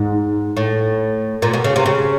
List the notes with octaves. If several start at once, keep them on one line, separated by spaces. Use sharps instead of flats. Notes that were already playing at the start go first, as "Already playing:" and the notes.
Already playing: G#2
A2
A#2
B2
C#3
C3
C#3